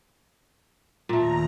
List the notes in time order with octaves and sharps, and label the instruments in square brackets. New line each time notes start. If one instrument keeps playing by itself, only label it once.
[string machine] D#2 A#5 [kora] A#2 A3